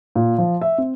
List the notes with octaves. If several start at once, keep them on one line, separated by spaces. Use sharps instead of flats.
A#2
F3
E5
C4